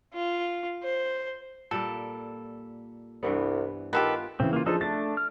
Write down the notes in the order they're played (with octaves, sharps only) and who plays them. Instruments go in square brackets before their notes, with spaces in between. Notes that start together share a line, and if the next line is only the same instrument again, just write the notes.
[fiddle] F4
C5
[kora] A#2 G3 A#3 [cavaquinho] A4
[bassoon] C2 [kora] G2 E3 B3
[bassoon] D#3 [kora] B3 F4 [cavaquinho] G4 A4 B4
[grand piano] C#3 E3 [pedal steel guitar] C4
[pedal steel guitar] A#3 F4
[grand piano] F3 G#4 C5 [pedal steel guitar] D4 D#4 A4
[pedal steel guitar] A3 D4 [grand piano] A6
[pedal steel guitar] F6